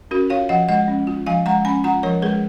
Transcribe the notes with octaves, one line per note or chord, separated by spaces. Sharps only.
C#4 F#4 A#4
F4 C#5 F5
F3 D#5 F#5
G#3 D#5 F#5
C#4
F4
F3 F5 G#5
G#3 F#5 A#5
C#4 G#5 B5
F4 F#5 A#5
F3 A#4 C#5
G#3 G#4 B4